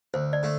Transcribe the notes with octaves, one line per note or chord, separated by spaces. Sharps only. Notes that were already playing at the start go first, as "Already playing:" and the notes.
D2 C5
D5
D3 A3